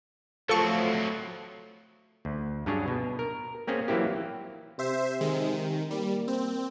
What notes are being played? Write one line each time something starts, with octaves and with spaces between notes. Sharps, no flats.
F3 F#3 A3 C4 A4 C#6
D2
G2 F#3 C#4 D4 G#4 C#5
B2
A#4
A#3 C4 C#4 G#4
E3 F#3 A#3 C4 E4 G4
C3 C5 E5
D#3 G#3
D#3
G3 A#3
C4